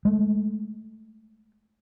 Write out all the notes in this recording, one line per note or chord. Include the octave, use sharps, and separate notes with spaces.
G#3 A3